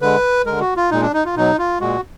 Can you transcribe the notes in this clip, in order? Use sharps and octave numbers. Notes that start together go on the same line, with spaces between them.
D3 G#3 B4
D3 G#3 A#4
F#4
F4
A#2 G#3 D#4
D4
D#4
F4
B2 F#3 D#4
F4
A#2 G#3 F#4